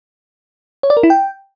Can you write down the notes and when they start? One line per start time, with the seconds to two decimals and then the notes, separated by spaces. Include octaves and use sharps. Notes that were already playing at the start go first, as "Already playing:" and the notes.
0.83 C#5
0.90 D5
0.97 A#4
1.03 E4
1.10 G5